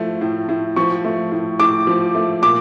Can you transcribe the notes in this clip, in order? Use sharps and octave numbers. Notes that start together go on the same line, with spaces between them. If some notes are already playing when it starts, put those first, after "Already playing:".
Already playing: A2 F3 A3
A2
A2
F3 C#6
A3
A2
A2 D6
F3
A3
A#2 D6